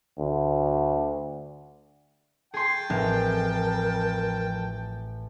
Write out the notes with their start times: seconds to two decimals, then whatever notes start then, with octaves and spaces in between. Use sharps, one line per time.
0.18 D2
2.54 G#4 G5 A5 C6
2.90 A1 F2 A#4